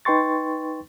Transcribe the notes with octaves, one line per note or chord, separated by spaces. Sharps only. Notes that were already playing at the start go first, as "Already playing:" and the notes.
D#4 B4 G5 C6 C#6 A6